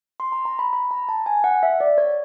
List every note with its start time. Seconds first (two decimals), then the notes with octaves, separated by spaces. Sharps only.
0.20 C6
0.32 A#5
0.45 A#5
0.59 B5
0.73 B5
0.91 A#5
1.09 A5
1.26 G#5
1.44 F#5
1.63 E5
1.80 D5
1.98 C#5